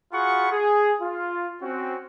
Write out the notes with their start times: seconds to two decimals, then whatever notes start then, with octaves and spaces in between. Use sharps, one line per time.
0.13 F4 F#4 G#4 F#5 B5 C#6
0.51 G#4
1.01 F4
1.62 C4 C#4 F#4